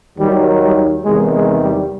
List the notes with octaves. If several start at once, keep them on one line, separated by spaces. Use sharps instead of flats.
D#2 D#3 F#3 G3
G3
E2 C3 D#3 G#3
G#3
G3